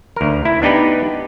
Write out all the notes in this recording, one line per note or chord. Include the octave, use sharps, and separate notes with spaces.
D2 A#4
E4
B3 D4 D#4 G4 B4